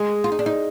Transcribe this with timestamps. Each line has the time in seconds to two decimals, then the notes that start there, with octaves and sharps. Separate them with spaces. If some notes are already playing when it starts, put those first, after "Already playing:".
Already playing: G#3 G#4
0.24 F4
0.32 D#4
0.39 D4
0.46 D#4